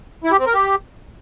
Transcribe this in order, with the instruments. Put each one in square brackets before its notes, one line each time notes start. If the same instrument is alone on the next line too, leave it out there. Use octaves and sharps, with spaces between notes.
[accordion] E4
G4
C4
A#4
G4